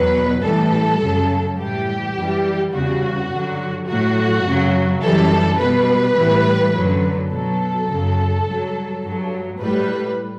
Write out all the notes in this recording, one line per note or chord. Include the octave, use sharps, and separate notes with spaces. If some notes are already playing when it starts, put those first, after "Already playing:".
Already playing: E2 B2 F#3 B4
A2 E3 G3 A4
F#2 C#3 F#3
A2 E3 G3 G4
F#2 E3 G3
E2 C#3 G3 F#4
G2 D3 F#3
A2 F#3 F#4
F#2 C#3 F#3
F#2 E3 G3 A4
B2 G3 B4
A2 E3 G3
F#2 D3 F#3
B2 F#3 A4
F#2 C#3 F#3
G2 F#3
G2 F#3
A2 G3 B4